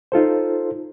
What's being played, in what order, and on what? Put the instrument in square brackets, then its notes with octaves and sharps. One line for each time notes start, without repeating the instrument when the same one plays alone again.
[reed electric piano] D#4 F4 A4 C5